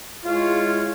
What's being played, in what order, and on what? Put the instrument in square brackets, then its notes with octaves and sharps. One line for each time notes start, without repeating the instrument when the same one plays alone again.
[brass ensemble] G#3 E4 C#5 [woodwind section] F4